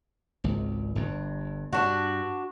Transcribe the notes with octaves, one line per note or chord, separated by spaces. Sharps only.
G#1 C#2
G1 G2
G2 D4 F#4